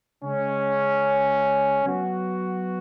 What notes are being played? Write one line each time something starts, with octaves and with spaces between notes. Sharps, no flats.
C#3 G#3 C#4
F#3 B3 F#4